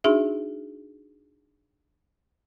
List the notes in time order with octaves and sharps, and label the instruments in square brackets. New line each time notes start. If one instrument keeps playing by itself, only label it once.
[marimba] D4 D#4 F#4 G#4 E5